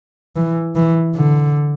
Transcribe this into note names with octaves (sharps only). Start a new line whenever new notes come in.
E3
E3
D3